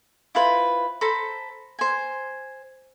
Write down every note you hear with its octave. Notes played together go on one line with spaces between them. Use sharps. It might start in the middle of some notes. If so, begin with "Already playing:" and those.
E4 F4 B4 C5
A4 C5 A#5 B5
C5 G#5